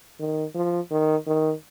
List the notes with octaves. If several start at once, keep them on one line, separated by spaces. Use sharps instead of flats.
D#3
F3
D#3
D#3